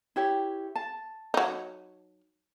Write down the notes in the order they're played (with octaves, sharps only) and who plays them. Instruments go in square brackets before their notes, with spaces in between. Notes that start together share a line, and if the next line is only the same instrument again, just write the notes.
[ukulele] E4 G4 C#5
A5
[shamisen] F#3 D#4